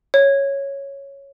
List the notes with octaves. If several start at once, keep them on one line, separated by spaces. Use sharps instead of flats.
C#5